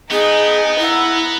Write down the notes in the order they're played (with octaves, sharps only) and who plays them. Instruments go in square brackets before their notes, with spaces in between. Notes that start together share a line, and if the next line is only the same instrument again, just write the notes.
[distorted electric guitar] B3 [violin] D#4 G5 [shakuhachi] G#4
[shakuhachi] E4 [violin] F#5 A#5